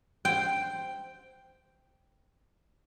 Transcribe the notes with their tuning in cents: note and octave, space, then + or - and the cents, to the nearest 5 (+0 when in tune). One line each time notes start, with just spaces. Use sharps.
C5 +0 G5 +0